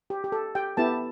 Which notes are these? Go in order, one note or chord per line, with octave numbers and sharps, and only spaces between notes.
G4
G4
A4
G4 G5
B3 E4 G4 A4 A5